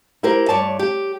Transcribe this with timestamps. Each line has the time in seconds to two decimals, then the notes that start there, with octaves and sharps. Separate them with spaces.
0.23 E4 G4 A#4 C5
0.49 G2 C#5 D5 A5
0.79 G4